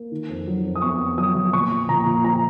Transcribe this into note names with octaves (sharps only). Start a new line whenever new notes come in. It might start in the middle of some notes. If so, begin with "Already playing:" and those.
Already playing: A#3
D#3
F2
F#3
F2
D#6
B3 C#6
F2
F#3 D#6
F#3
A#2 C#6
F3
A#2 A#5
A#2
F3 A#5